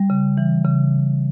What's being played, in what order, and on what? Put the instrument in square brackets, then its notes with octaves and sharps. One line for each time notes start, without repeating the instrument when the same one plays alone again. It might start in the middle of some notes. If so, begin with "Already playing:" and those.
Already playing: [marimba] G3
C#3
E3
C#3